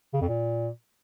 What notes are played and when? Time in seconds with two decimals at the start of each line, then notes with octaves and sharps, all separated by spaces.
0.13 C#3
0.21 F2
0.29 A#2